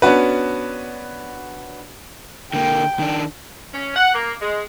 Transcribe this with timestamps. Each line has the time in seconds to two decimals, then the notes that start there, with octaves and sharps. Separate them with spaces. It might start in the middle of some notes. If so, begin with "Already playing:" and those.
0.02 B3 C#4 D4 F#4 B4
2.54 D3 A#3 G5
2.99 D#3 D4
3.73 C#4
3.95 F#5
4.14 A#3
4.41 G#3